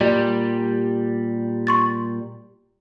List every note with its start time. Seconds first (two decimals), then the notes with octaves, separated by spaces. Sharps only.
0.01 A#2 G3 G4 D5
1.67 C6 C#6 A6